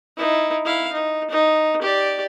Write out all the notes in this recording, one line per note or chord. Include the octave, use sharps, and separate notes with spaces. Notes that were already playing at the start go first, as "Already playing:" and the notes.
D#4 E4
E4 F5
D#4
D#4
G4 D5